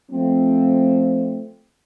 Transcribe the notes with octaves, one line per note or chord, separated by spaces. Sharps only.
F3 A3 C4